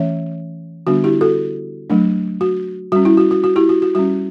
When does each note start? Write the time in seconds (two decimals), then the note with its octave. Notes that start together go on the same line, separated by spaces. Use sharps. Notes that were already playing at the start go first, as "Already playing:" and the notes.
Already playing: E3 A3 C#4 C#5 E5
0.87 D3 G3 B3 D4 F#4
1.04 E4 G4
1.21 F#4 A4
1.90 F#3 A3 D4
2.41 F#4
2.92 G3 C#4 F#4
3.05 E4
3.17 F#4
3.31 F#4
3.44 F#4
3.56 E4 G4
3.69 F#4
3.82 F#4
3.95 G3 C#4 F#4